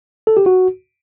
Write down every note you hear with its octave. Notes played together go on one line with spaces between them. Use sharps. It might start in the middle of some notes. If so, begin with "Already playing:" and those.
A4
G4
F#4